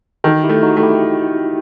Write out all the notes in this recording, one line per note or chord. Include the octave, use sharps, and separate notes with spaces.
D#3 F#4 A4
E4 G4
A3
D#4 F#4
A3
E4 G4